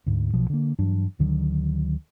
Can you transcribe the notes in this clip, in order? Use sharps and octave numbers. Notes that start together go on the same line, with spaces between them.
D2 G#2
B1 B2 F3 F#3
D3 A#3
G2 E3 F#3 D4
D2 D3 D#3 F#3